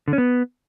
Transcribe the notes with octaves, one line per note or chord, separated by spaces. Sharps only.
D3
C#4
B3